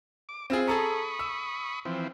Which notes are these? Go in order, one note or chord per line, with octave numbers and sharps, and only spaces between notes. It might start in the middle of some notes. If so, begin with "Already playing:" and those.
D6
C4 E4 F4 G#4
G#4 A4 A#5 B5 C#6 D#6
E6
E3 F3 C4